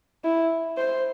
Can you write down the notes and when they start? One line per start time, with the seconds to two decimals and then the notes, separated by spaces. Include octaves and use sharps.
0.24 E4
0.78 C5